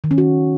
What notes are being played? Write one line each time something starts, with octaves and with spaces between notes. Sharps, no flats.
D#3
C#4
F#4